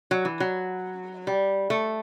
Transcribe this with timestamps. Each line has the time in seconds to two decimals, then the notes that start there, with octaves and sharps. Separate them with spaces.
0.11 F#3
0.25 E3
0.40 F#3
1.27 G3
1.70 A3